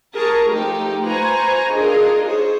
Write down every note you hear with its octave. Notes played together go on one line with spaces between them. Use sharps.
G#4 A#4 A5 A#5 C#6
F3 A3 D#4 G4
F4 B4 C5 G#5 A#5 C#6
D4 D#4 F4 G#4 A#4 D#5
G#4 C5 C#5